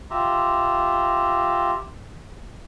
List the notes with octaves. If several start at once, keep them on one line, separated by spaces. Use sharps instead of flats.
F4 G4 E5 A#5